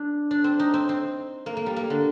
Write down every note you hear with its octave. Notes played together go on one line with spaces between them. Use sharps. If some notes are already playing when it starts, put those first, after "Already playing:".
Already playing: D4
D4
C4
D#4
C4
C4
A#3
A#3
G3
A#3
D3